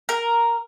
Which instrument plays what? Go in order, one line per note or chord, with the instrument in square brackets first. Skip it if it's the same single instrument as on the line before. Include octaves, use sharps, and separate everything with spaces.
[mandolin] A#4